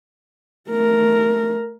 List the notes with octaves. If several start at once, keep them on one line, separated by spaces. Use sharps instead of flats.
A3 A#4